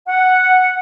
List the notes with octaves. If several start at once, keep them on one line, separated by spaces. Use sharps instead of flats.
F#5